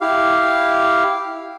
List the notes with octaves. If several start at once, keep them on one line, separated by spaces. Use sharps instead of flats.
E4 G4 F5